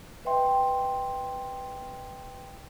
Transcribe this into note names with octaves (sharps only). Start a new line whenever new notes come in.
B4 D#5 E5 G5 C6